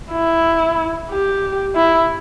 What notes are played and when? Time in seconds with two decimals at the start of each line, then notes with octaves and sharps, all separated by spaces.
0.12 E4
1.11 G4
1.76 E4